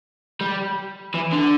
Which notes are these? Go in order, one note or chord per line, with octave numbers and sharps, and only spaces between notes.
G3
E3
D3